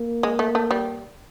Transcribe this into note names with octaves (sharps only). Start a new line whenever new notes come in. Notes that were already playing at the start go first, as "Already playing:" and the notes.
Already playing: A#3
G#3
A3
A3
G3